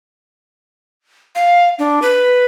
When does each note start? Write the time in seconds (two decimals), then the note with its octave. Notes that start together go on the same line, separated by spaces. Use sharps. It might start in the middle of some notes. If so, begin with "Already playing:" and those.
1.35 F5
1.79 D4
2.02 B4